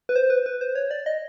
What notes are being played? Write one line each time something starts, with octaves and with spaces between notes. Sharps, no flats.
B4
C5
B4
B4
C5
C#5
D5
D#5